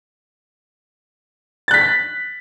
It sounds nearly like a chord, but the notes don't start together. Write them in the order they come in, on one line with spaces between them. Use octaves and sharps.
A6 F#6 B6